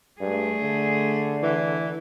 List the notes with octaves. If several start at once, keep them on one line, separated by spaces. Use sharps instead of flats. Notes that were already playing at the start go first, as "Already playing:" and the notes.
G2 A3 G#4
D3
E3